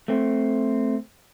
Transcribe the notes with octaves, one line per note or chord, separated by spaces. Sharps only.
A3 C4